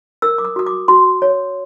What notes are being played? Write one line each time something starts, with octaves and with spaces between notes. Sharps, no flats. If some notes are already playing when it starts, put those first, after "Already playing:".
A#4 E6
D6
D#6
F#4 D#6
D6
F#4 C6
C#5